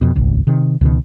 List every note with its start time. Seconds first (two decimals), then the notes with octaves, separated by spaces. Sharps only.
0.01 F2 B2
0.15 D#1 G#1 C#2
0.47 C3 D#3
0.81 C#2 B2 D3 D#3